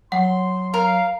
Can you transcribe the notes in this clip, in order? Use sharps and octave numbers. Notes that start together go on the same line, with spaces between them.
F#3 F#5 C6
A#4 F5